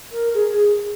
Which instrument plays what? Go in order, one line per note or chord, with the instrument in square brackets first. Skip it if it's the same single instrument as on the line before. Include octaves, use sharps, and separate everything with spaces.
[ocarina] A#4
G#4